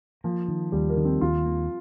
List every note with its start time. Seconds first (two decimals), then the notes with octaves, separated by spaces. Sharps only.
0.24 F3 A#3
0.48 D#3
0.72 D#2 G3
0.89 A#3
0.97 D#3
1.05 C4
1.21 D#2 F4
1.46 A#3